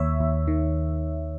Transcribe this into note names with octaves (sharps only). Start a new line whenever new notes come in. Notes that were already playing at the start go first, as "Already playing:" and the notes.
Already playing: D#2 C#5 E5
D#2
D#3